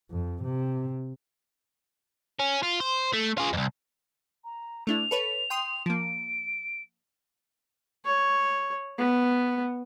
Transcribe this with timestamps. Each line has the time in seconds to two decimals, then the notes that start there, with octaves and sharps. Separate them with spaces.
0.10 F2
0.43 C3
2.40 C#4
2.63 F4
2.80 C5
3.14 A3
3.38 F4 G#4
3.53 C2 F2
4.45 A#5
4.87 A3 D4 E4 F7
5.11 A4 B4 C#5
5.50 G5 C6 D#6
5.86 F3 A#3 D7
8.05 C#5
8.98 B3